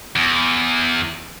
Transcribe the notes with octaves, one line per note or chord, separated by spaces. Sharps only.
E2